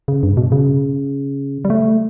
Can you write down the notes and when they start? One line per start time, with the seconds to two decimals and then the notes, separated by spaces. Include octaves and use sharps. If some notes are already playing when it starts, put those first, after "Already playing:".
0.08 C#3
0.23 G2
0.37 B2
0.52 C#3
1.65 G3
1.70 A3